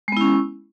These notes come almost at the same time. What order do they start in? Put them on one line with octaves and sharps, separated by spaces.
G#3 B3 E4 C#4